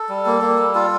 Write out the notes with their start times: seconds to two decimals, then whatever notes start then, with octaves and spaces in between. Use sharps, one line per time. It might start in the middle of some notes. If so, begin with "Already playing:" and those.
Already playing: A4
0.09 G3
0.26 A#3
0.42 A#3
0.59 G3
0.75 F4 A4